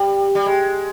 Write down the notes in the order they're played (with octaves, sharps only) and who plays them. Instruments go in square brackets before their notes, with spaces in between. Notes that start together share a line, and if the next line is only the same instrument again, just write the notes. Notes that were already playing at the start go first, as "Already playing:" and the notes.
Already playing: [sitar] G3
G3
G#3